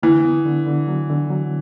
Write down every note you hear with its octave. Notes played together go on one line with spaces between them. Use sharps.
D3 E3
B3
D3
D3
F#3
D3
F#3